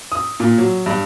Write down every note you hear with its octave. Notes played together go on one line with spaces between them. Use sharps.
D#6
A#2
F#3
G2